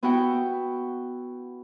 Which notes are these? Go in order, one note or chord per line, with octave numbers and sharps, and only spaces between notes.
B3 E4 F#4 F#5 G5